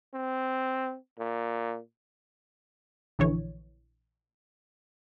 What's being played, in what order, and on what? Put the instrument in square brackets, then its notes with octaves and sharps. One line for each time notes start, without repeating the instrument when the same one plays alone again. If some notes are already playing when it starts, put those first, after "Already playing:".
[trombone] C4
A#2
[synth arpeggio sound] A#1 D3 E3 C#5